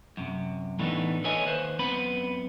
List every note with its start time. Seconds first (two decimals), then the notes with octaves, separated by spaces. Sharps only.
0.17 F#2 C3
0.79 A2 E3 A3 B3 D4 D#4
1.24 A4 B4 C#5 D#5 E5 G#5
1.45 D#2 B4 C5
1.79 F#2 B3 C4 B4 B5